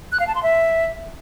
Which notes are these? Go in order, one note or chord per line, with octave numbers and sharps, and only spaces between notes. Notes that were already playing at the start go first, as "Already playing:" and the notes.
F#6
F5
A5
C6
E5